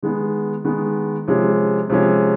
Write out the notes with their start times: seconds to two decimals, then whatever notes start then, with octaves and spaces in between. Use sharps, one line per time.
0.02 D#3 G#3 B3
0.65 D#3 G#3 B3
1.28 C3 F3 G#3 C#4
1.90 C3 F3 G#3 C#4